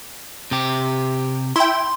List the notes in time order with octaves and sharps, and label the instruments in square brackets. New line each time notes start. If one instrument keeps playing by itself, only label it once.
[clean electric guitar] C3 G4
[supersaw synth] E4 G5 [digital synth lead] C6